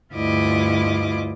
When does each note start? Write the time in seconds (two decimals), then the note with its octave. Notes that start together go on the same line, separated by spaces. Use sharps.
0.15 D2 G2 E4 F4 D#5 D6